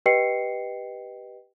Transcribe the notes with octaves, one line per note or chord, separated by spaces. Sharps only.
G4 B4 D#5 G5 C7 C#7